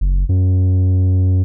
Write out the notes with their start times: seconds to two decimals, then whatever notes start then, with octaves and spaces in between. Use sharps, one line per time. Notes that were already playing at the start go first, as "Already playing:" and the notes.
0.01 F#1
0.29 F#2